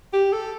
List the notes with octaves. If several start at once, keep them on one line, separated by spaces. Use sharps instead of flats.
G4
A4